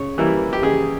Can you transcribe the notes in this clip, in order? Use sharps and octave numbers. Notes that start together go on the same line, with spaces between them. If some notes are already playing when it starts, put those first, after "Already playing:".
Already playing: C#3 C#5
E3 G3 A#3 E4
G4
C#3 G#4